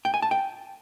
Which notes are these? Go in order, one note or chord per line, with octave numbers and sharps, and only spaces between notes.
G5
G#5
A5
G5